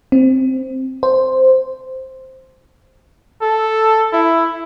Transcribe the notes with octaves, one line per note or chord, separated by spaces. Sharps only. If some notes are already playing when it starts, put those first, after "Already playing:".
C4
C5
A4
E4